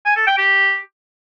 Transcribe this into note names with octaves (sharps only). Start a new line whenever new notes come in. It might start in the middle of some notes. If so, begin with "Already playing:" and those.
G#5
A4
G5
G4